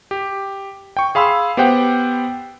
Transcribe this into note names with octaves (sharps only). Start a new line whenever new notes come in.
G4
G5 C#6
G#4 F5 B5 C6 E6
B3 G4 C5 F#5 G5